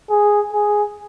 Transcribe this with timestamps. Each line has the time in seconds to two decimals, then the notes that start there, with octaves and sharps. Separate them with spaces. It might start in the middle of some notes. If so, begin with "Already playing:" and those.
0.10 G#4
0.53 G#4